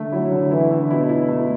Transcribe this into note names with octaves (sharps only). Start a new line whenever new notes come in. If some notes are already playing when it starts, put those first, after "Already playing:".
Already playing: D3 A3
F#3 E4
D3
E3 E4
D3
B2 E4
E4
A3